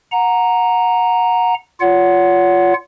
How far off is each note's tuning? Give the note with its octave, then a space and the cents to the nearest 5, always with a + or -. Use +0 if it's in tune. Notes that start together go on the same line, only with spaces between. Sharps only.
F#5 -20 A#5 +0
F4 +0 C#5 +40 F#5 +0